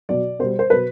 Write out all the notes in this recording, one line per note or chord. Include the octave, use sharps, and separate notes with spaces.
B2 F#3 D5
B2 G3 C5
C5
B2 F#3 B4